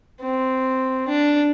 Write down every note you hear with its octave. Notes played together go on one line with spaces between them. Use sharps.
C4
D4